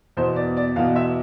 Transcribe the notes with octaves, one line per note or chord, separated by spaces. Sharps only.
E2 B2 C5
D5
D5
E2 B2 F5
E5